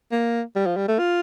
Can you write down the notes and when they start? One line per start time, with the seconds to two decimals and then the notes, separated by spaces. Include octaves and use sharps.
0.12 A#3
0.55 G3
0.66 F3
0.77 G3
0.88 A3
0.99 F4